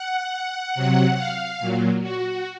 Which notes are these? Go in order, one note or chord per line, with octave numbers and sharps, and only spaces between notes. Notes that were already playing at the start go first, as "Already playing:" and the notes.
Already playing: F#5
C3 F#3
F5
A#2 F#3
F#4